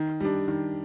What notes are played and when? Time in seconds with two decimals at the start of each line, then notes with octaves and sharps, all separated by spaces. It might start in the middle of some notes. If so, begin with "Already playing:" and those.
Already playing: D#3
0.20 G3 D4
0.48 D#3